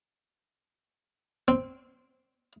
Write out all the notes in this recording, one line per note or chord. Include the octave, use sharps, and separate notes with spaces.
C4